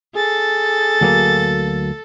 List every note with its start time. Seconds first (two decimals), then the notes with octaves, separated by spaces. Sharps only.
0.16 G#4 A4 A6
1.01 D2 F#3 A#3